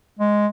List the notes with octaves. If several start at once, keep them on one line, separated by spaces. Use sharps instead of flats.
G#3